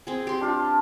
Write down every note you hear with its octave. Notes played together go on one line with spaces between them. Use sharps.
C4 G#4
G4 C6
D4 F4 A5